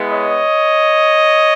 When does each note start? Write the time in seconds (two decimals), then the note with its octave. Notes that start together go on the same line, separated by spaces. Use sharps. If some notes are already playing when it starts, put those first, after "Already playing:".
Already playing: G#3 B3 E4
0.12 C#5 D#5